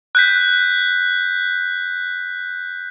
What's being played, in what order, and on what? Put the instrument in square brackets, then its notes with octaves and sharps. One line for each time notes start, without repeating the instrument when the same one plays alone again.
[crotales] F#6 G6 B6